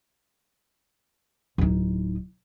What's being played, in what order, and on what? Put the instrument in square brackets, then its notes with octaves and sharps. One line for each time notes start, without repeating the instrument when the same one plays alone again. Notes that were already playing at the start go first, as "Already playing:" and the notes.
[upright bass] D1 D#4